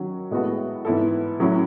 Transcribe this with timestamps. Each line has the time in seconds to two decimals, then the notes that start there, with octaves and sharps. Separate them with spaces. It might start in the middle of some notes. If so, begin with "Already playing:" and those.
Already playing: D#3 F#3 C#4 F#4
0.31 A2 G#3 B3 F#4 A4
0.85 G#2 E3 B3 E4 A4
1.40 A2 F#3 C#4 E4